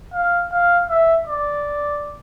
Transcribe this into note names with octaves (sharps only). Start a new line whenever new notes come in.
F5
F5
E5
D5